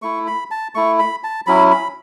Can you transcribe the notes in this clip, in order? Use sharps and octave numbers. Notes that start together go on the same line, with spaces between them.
A3 E4 C#6
B5
A5
A3 E4 C#6
B5
A5
F#3 C#4 E4 B5
B5